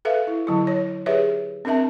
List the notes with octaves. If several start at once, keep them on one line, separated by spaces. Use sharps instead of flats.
A4 B4 E5 F5
E4
D3 F#3 E4
C#5
G4 G#4 B4 C#5 D5 E5
C4 D4 A#4 E5 A5